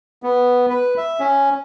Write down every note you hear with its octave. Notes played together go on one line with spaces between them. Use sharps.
B3
B4
E5
C#4